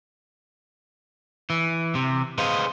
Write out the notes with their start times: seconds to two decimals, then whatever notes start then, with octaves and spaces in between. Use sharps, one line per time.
1.50 E3
1.95 C3
2.38 G#4 B4 C5 D#5 F5